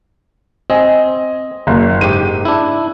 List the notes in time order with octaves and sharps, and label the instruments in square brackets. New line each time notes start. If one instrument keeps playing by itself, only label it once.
[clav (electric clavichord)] C4 [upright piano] D#5 G#5
[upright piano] F#1
[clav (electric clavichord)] G#2 G4 [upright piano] D#7
[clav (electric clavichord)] D4 E4